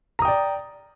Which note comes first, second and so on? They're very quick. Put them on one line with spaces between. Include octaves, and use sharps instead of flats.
A#5 D#6 G5 D5